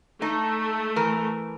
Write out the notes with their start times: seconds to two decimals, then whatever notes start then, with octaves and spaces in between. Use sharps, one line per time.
0.22 A3 D#4
0.96 E3 A#4